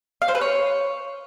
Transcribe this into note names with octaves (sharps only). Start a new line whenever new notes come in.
F5
C5
B4
C#5